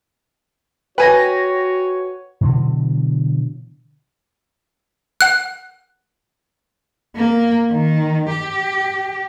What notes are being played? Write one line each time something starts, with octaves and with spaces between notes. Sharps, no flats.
F#4 B4 C#5 G5 G#5 A#6
B2 D3 E3 F#3
F#5 F#6
A#3
D#3
G4